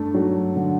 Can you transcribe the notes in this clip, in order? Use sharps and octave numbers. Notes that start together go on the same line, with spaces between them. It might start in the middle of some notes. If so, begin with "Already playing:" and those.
Already playing: G2 A3 D4
F#3
D3